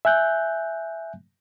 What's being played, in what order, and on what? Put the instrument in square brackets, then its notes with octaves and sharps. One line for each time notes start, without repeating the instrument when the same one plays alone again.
[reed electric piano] E5 G#5 F#6 G6